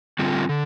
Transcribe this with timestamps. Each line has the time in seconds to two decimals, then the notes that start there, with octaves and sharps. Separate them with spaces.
0.19 D3 G3 C4 F4
0.49 D3